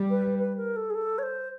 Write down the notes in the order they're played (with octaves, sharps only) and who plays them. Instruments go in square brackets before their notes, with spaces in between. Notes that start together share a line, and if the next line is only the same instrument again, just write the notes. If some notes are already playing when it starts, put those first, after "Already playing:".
Already playing: [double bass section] G3
[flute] B4
B4
A#4
A4
G#4
A4
C#5
C5